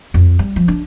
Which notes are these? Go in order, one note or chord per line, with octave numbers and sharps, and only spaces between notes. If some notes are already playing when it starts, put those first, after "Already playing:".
F2
G3
F3
D4